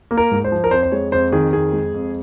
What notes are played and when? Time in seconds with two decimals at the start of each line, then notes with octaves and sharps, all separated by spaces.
0.11 A#3
0.17 A#4
0.32 G#2
0.44 C5
0.52 F3
0.64 A#4
0.71 F2 C5
0.83 C5
0.92 G#3 C#5
1.12 F2 C5
1.32 D#3 G#4
1.53 F2 G#4
1.73 G#3
1.94 F2